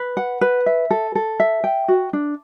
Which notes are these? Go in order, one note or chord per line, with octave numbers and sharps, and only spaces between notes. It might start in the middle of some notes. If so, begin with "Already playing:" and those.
Already playing: B4
F#5
B4
E5
A4
A4
E5
G5
F#4
D4